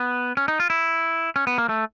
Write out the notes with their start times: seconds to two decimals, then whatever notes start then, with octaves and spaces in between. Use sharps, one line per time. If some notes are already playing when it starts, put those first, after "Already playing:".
Already playing: B3
0.37 C#4
0.48 D#4
0.60 F4
0.70 E4
1.36 C#4
1.47 B3
1.58 A#3
1.69 A3